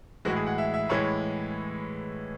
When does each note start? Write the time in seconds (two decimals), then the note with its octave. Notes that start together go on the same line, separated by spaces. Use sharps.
0.25 A2 E3 G#3 F#4
0.36 G#4
0.46 F#5
0.58 E5
0.74 E5
0.89 A2 E3 G#3 C#5